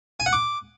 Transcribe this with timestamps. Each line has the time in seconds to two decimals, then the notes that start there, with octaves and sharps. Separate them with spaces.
0.20 G#5
0.26 F#5
0.33 D6